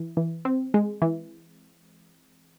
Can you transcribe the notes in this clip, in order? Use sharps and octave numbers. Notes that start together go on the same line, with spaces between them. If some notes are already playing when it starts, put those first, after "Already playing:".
Already playing: E3
E3
C4
G#3
E3